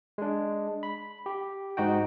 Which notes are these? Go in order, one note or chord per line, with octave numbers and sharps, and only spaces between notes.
G#3 D4
B5
G4
G#2 D#4 F#4 G5